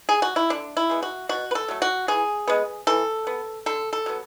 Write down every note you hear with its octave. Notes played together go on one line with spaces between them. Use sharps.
G#4
F#4
E4
D3 D4
E4
G#3 B3
F#4
B2 F#4
B4
A4
F#3 A3
F#4
E3 G#4
G#3 B3
E3 A4
B3
D3 A4
A4
F#3 B3